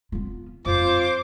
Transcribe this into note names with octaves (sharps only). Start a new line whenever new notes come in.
B3 F4
F2 F4 C5 D6